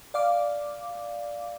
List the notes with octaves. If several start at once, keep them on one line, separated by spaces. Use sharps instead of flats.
D5 F5 D6